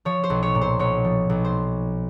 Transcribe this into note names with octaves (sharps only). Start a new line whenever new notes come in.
F3 C#5
C5
B1
C#5
A#2
C5
B1 C#5
F3
B1
C5